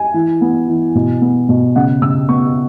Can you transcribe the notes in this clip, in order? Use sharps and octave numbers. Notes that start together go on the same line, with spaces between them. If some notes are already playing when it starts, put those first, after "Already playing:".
Already playing: G#5
E3
B3
E3
B2
B3
B2
C#3 F#5
C#3 E6
B3 C#6